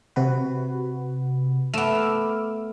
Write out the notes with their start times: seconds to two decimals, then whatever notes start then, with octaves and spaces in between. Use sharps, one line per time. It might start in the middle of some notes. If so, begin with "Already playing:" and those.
0.16 C3 F#4 B4
1.74 A3 B3 D6 E6 F6